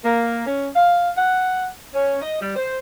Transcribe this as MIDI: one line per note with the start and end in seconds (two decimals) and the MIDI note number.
0.04 0.43 58
0.45 0.67 61
0.75 1.09 77
1.16 1.68 78
1.93 2.16 61
2.21 2.38 75
2.41 2.55 55
2.56 2.77 72